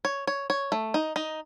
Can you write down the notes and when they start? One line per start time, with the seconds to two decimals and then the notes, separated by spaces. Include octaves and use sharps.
0.05 C#5
0.27 C#5
0.50 C#5
0.72 A3
0.94 D#4
1.16 D#4